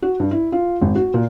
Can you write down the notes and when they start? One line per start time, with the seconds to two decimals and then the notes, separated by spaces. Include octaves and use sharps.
0.02 F#4
0.20 G2
0.31 E4
0.52 F4
0.81 G#1
0.95 F#4
1.14 A#2